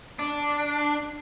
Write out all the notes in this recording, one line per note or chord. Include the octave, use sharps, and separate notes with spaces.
D4